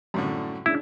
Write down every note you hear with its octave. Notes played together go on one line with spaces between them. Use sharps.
F#2 A2 D3 G3 C4
G#3 C#4 D4 E4